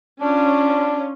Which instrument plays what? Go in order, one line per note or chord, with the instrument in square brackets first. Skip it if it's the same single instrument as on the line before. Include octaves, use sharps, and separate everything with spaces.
[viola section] C#4 F4 [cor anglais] D4